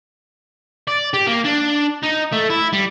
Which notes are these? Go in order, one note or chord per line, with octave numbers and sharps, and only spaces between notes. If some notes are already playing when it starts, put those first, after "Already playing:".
D5
G4
A#3
D4
D#4
A3
E4
G3